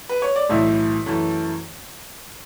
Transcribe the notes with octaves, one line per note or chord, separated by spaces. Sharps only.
B4
C#5
D5
B1 A2 E3 E5
F#2 E3 A3